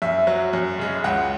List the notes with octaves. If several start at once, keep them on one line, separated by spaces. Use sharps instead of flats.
F#2 E5
F#3
F#2
C#3 G#3
C#2 F#5